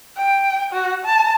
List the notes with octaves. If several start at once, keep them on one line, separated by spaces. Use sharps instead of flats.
G5
F#4
A5